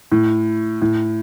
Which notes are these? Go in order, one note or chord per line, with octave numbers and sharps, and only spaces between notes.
A2
A2